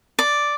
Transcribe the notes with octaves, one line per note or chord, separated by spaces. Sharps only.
D5